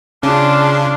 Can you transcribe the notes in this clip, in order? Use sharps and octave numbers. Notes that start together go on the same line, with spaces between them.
C#3 D4 F4